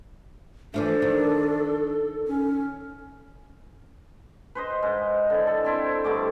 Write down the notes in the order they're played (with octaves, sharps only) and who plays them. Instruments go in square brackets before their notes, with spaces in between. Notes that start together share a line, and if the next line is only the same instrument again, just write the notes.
[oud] E3 F3 A3 [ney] D4 [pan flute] A4
[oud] D#3
[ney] C#4
[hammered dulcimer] B4 C5 D#5
G#2
D3 E4
A4
C4 E4 C5
G2 D3 A3 D6